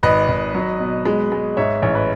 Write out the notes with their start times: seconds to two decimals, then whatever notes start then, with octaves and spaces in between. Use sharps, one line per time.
0.03 G#1 B4 D#5
0.28 G#1
0.55 F#3
0.80 B2
1.05 G#3
1.32 G#3
1.57 G#2 C#5 E5
1.82 A1 C#5
1.95 B4